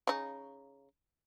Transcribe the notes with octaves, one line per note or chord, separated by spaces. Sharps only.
C#3 D#4